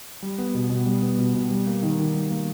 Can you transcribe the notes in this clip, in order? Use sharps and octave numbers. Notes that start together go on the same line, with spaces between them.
G3
B3
B2
B2
G3
B3
B2
B2
G3
A#3
D#3
D#3
G3
A#3